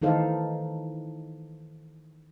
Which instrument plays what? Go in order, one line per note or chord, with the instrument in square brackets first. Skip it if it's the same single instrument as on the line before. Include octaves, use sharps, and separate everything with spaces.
[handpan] D#3 E3 D#4 A4 C5 F5